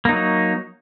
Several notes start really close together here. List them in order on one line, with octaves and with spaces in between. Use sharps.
A#3 D#4 F#3